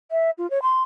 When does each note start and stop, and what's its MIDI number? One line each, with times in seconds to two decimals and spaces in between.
0.11 0.31 76
0.38 0.49 65
0.51 0.62 73
0.62 0.83 84